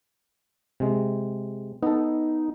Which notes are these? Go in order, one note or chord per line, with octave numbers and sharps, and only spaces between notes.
C3 G#3
B3 D#4 A4